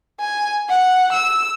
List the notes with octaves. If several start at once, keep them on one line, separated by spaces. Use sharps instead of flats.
G#5
F#5
E6